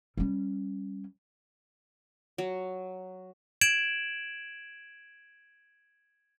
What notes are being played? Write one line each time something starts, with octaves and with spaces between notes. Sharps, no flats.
G3 C#4
F#3
G#6 D7 E7 F#7